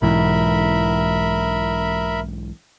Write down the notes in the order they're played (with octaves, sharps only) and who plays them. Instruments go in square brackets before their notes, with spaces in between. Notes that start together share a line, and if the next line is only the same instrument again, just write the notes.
[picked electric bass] B1 G#2 E3 [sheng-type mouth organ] A#4 E5 B5